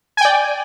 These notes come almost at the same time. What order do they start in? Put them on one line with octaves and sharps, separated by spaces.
G#5 G5 D5